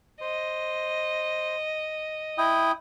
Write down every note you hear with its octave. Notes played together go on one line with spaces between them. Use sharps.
C5 D#5
E4 G5 D#6